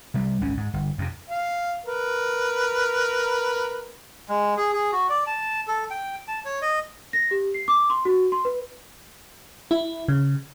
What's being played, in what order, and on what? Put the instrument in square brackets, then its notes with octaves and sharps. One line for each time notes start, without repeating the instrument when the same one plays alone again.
[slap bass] C3 G3
G#1 C#2 C#3 C#4
G#2
G1
F2 C3
[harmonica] F5
A#4 B4
[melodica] G#3
G#4
G#4
F#4
D5
A5
A4
G5
A5
C#5
D#5
[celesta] A#6
G4
C7
D6
C6
F#4
C6
B4
[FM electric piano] E4
C#3